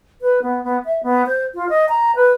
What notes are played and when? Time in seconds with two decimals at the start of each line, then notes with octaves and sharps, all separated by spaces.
0.22 B4
0.42 B3
0.64 B3
0.85 E5
1.03 B3
1.26 C5
1.55 F4
1.69 D#5
1.89 A#5
2.15 B4